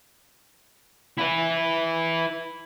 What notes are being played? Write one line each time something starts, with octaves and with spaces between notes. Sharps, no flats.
E4 B4